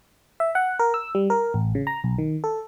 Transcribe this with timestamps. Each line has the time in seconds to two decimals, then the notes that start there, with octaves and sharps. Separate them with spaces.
0.40 E5
0.55 F#5
0.79 A#4
0.94 E6
1.15 G3
1.30 A#4
1.54 A1
1.75 C#3
1.87 A#5
2.04 B1
2.18 D#3
2.44 A4